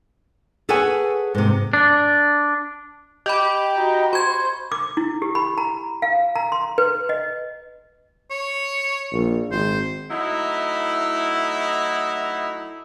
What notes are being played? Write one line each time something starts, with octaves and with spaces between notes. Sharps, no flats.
G#4 A4 B4 C#5 F#5 G#5
G#2 C3
D4
G4 D#5 B5
D#4 F#4
C5 B5 C#6 G#6
D6
E4
G4
B5
A#5
F5
A#5
C6
B4
D#5
C#5
A#1
G#1 C5
F#3 A3 D#4 E4